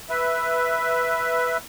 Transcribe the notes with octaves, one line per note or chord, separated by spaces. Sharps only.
B4 E5